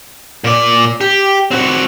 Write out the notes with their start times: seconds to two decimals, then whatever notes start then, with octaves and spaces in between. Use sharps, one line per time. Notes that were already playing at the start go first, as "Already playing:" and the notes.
0.44 A#2 D5
1.01 G4
1.51 C4 F#4